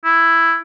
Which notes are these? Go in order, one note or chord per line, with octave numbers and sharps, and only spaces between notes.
E4